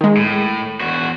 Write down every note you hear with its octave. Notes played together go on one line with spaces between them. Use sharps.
D#3 G#3
A2
E2 F#4